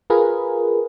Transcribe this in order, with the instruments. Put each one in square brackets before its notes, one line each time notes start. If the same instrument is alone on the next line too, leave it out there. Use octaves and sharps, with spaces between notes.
[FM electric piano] F4 G#4 A#4 B4